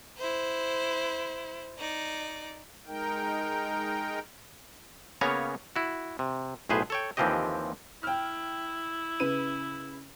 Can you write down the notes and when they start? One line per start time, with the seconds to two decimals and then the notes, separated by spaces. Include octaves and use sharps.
0.18 E4 C5
1.78 D#4 D5
2.87 G#3 D#4 A#4 G5
5.21 C#3 A#3 B3 C#4 C#5 A#5
5.76 E4 F#4
6.19 C3
6.69 B1 A2 G#4 B4 C5
6.90 A4 C#5 G5
7.17 D#2 E3 F3 C4 G4 D#5
8.03 E4 G5 F6
9.20 C#3 B4 D#7